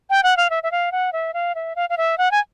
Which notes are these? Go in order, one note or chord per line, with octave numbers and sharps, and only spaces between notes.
G5
F#5
F5
E5
E5
F5
F#5
E5
F5
E5
F5
F5
E5
F#5
G#5